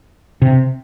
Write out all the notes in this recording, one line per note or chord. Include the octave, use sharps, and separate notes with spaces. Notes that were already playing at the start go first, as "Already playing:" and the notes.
C3